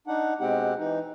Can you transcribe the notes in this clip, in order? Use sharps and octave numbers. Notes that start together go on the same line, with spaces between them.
D4 D#4 F#5
B2 G#3 C4 G4 F#5
E3 D#4